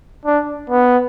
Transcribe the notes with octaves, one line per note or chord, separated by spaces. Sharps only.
D4
B3